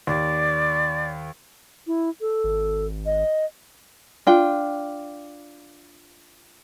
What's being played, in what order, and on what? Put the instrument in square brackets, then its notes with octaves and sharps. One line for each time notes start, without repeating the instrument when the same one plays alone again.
[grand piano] D#2 [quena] D5
[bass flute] E4
A4
[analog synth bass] G#1
[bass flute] D#5
[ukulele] D4 F4 G5